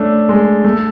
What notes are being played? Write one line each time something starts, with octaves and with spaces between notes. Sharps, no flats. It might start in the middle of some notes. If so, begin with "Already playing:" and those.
Already playing: A3 C#4 D4
G#3
A3